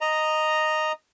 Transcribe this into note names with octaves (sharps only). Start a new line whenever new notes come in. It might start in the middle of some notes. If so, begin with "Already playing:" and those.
D#5 A#5